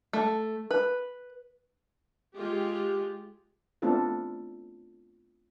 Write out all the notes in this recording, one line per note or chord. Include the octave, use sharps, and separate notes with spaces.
A3
B4
G#3 F4 G4
A3 B3 C4 D4 F4 A4